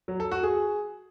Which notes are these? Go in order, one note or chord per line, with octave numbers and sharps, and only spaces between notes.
F#3
A4
F#4
G#4